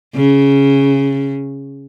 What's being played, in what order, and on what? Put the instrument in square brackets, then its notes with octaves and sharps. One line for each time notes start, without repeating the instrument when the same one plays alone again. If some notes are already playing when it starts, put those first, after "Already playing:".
[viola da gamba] C#3